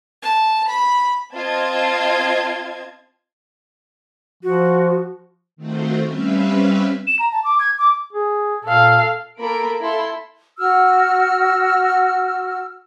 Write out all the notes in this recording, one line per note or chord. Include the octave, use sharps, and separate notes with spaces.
A5
B5
C4 F4 D#5 A5 G#6
F3 F#4
D#3 A3 C4 F4 F#4 C5
G3 C4 C#4 B4 E5 F5
E7
A#5
A5
D6
G#6
D6
G#4
A#2 A4 F5
A#3 F4 A4 A#4 B5 D7
E4 F4 A4 C6
F#4 E6 F6